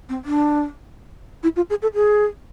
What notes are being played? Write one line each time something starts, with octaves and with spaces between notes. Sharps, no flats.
C4
D4
E4
F4
G#4
A4
G#4